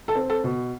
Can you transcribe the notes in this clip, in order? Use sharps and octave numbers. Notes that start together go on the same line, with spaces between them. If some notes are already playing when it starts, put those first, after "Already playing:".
A4 A5
C4
A4 A5
B2